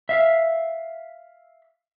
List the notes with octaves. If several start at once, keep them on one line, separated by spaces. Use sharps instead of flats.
E5 F5